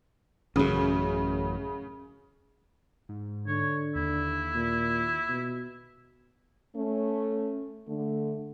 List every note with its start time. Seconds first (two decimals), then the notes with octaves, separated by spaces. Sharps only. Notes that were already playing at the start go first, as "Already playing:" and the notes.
0.56 A1 F#2 C#3
3.09 G#2
3.47 D3 C#5
3.95 D#2 E4
4.55 A#2
5.29 B2
6.76 A3 C#4
7.88 D3 A3